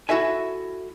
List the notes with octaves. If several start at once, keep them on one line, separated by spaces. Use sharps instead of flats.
E4 F#4 A4 E5 G#5